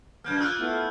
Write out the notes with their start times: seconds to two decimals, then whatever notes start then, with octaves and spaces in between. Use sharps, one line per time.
0.24 F#2 A#3 F6 G6 G#6
0.40 A#3 F4 E6 F#6
0.60 A3 B3 E4